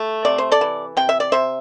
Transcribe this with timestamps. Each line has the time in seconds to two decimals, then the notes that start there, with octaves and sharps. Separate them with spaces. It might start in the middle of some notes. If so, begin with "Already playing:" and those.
Already playing: A3
0.25 C3 D5
0.38 C5
0.52 A4 D5
0.61 E3
0.97 C3 G5
1.09 E5
1.20 D5
1.32 C3 C5 E5